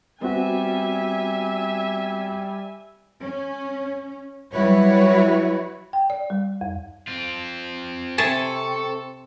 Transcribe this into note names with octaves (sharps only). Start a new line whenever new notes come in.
G3 B3 C4 F#4 E5 G#5
C#4
F#3 G3 E4 F#4 B4 C#5
G5
D5
G3
F2
C4 F4
C3 C4 G#4 A4 E5 A5 C#6